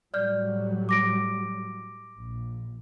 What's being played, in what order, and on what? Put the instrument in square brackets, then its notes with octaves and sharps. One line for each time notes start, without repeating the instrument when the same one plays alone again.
[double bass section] A2 F#3 G3 [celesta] D5 F6 G6
[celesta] D6 A#6 D7
[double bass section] A#1